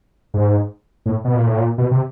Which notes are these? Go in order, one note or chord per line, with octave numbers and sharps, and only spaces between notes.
G#2
A2
B2
A#2
A2
A#2
B2
C3